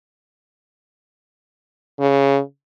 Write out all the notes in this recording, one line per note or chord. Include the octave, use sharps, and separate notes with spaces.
C#3